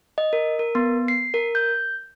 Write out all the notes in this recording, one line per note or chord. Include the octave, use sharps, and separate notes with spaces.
D#5
A#4
A#4
B3
C7
A#4
G6